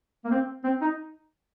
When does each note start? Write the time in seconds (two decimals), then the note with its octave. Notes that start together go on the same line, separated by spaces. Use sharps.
0.25 A#3
0.31 C4
0.64 C4
0.82 D#4